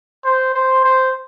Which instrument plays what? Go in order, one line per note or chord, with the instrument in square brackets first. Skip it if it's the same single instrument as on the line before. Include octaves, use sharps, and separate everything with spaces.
[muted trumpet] C5
C5
C5